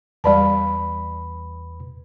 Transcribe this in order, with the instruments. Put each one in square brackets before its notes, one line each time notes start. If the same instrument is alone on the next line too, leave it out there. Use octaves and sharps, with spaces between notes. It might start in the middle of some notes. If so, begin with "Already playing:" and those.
[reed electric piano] E2 B4 B5 [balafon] G3 D5 A5